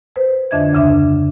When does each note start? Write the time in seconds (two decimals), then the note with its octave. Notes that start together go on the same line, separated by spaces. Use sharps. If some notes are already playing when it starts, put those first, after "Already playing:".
0.16 B4 C5
0.51 F2 D3 D4 D#5 E5 G#6
0.73 D2 C#3 D4 E5